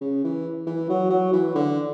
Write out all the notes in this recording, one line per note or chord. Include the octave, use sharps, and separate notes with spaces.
C#3
E3
E3
F#3
F#3
E3
D3